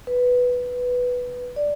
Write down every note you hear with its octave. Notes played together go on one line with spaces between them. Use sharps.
B4
D5